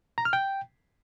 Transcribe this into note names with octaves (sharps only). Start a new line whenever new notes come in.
A#5
F6
G5